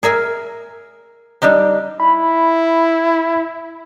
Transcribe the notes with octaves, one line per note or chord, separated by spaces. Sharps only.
G#4 A#4 E5 G#5
G3 D4 D#4 G4
E4 B5